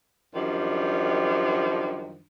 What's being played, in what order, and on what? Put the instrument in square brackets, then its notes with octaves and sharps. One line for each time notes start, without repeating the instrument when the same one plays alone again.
[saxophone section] F#2 D#3 F3 G3 D4